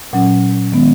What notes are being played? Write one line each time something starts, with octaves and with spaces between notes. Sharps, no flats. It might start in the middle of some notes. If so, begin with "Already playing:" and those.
A#2 F#3 C#4 F#5
D#3 G#3 B3